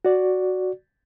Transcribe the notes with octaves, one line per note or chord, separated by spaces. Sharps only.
F#4 D5